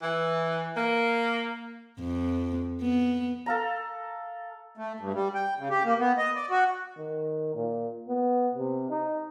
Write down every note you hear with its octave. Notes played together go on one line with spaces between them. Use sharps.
E3
A#3
F2
B3
A4 F5 A#5
A3
G2
G3
G5
C#3
G4
A#3
B3
D#5
D5
F#4
D#3
A#2
B3
C3
D#4